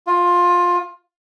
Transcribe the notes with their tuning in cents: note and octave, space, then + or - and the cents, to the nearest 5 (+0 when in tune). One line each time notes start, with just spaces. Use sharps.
F4 +15